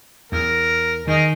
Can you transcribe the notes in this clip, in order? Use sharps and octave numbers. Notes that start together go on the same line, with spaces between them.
E2 A#4
D#3 D#4 G#4 A#4